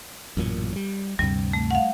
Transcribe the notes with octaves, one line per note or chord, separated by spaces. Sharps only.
A1 F#2 A#2
G3
D2 G2 C3 G3
A3
F5 F#5